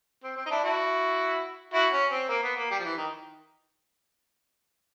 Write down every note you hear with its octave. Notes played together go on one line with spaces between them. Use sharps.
C4
C4
D#4
D4 E4
E4 F#4
E4 F#4
C#4
C4
A#3
B3
A#3
G3
F3
E3
D#3